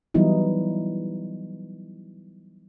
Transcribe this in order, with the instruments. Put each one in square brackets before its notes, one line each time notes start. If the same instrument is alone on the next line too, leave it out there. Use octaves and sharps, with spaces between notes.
[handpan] E3 F#3 G3 B3 D#4 E4